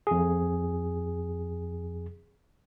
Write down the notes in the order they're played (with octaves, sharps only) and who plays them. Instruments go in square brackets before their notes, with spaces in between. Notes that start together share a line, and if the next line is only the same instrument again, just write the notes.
[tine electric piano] F2 G#4